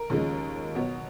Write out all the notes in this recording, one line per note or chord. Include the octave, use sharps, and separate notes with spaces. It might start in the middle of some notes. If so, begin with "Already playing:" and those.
Already playing: A#4
D#2 C#3 F3 G#3
B2 F#3 B3